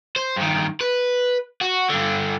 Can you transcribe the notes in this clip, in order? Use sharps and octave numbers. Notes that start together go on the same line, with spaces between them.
C5
G2 D#3
B4
F#4
G2 D3